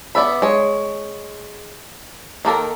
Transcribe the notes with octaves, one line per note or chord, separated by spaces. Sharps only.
B3 B4 D5 E5 B5
G#3 C#5
D#3 A#3 A4 A#4